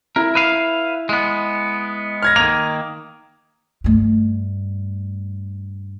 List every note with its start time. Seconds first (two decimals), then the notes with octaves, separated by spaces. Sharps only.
0.16 E4 A#4
0.35 B4 E5 F5
1.09 G#3 B3
2.23 F6 G#6 A#6
2.36 D#3 A#3 F7
3.84 G2 A3